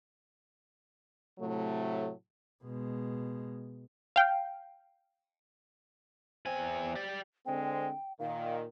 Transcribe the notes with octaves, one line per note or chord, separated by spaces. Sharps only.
A2 C3 F#3 A3
B2 G#3
F5 G5
E2 C4 G#5
G4 D5
D3 G#3 C4 G5
A#2 D#3 F5